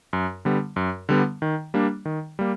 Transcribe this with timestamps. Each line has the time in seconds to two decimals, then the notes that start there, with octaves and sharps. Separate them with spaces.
0.13 F#2
0.45 D3 G3 B3
0.76 F#2
1.09 D3 G3 B3
1.42 D#3
1.74 G3 A#3 D4
2.05 D#3
2.39 G3 A#3